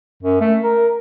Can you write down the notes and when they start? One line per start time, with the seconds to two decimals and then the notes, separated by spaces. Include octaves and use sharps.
0.23 F#2
0.41 A3
0.63 A#4